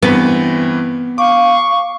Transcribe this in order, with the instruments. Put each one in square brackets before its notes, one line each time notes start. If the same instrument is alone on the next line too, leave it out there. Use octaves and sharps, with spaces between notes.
[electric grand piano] G2 E3 C4 [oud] B3
[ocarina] F5 [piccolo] C#6 [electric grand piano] D6